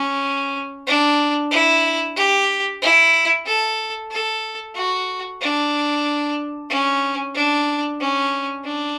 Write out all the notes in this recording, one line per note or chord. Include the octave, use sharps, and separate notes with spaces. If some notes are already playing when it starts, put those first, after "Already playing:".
Already playing: C#4
D4
E4
G4
E4
A4
A4
F#4
D4
C#4
D4
C#4
D4